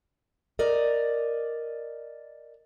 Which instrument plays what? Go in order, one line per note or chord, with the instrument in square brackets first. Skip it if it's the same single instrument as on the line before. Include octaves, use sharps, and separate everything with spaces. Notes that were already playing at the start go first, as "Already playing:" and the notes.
[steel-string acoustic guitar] A#4 D5 D#5